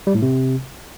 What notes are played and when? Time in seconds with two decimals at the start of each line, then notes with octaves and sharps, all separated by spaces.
0.07 G3
0.15 A2
0.22 C3